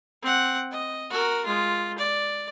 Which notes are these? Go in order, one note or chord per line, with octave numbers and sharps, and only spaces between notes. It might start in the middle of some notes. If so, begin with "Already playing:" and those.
C4 F#5
D#5
F#4 A#4
G#3 F4
D5